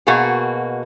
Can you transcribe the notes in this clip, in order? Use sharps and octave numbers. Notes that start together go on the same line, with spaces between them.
B2 A#3 F#4 G#4